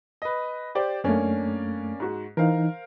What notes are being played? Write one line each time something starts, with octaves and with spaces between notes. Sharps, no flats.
B4 D#5
G4 C5 D5
F#2 A3 A#3 C#4 D4
G#2 F#4
E3 D#4 A#4 C5 F5